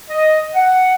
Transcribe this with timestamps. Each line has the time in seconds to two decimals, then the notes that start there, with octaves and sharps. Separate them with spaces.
0.10 D#5
0.55 F#5